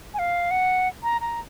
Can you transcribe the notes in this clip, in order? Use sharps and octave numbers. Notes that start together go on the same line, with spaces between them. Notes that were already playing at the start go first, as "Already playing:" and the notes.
G#5
F5
F#5
A#5
A#5